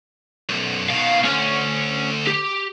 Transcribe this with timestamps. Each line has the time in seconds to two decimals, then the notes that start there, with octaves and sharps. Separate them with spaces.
0.49 B1 F#2
0.90 B2 D#3 F5
1.25 D2 C#4
2.27 G4